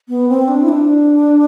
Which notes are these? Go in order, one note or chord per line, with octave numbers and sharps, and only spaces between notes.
B3
C4
D4
E4
D4